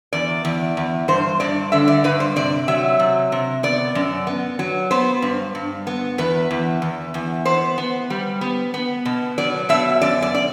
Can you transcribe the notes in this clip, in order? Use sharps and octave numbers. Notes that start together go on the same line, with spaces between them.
E2 D5
E2
E2
G2 C5
G2 D5
D3 E5
D5
G2 B4
C5
C3 D5
F#3 E5
C3
C3
B3 D5
F#2
B3
F#3
B3 C5
G2
G2
B3
E2 B4
E2
E2
E2
B3 C5
B3
G3
B3
B3
B2
F#3 D5
B2 E5
F#2 D5
D5
D5